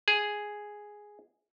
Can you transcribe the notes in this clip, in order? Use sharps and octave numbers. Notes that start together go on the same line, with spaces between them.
G#4